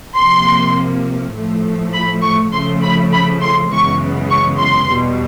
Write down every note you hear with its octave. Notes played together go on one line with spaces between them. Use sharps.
C3 F3 A#3 C6
A2 F3 A3
B5
C#6
C#3 F3 A3 C6
B5
B5
C6
F#2 C#3 E3 G#3 B3 C#6
C#6
C6
E2 B2 G3